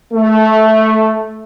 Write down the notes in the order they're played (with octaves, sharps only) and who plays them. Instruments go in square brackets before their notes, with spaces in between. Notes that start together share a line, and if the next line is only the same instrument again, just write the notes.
[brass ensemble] A3